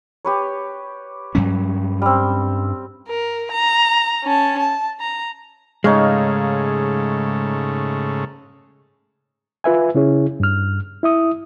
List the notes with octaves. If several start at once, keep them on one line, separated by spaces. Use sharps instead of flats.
G4 B4 C#5
G2 F#3 C#4
G3 C4
A#4
A#5
C#4 A5
A5
A#5
G#2 C#3 G#3 A3 D#4 C#5 F5
F4 B4 E5 G#5
C#3 C#4 E4 G#4 C#5
G2 F6
E4 E5 D#6